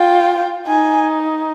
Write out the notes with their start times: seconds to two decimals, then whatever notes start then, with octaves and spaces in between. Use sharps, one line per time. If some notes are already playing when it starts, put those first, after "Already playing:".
Already playing: F4 G5
0.67 D#4 G#5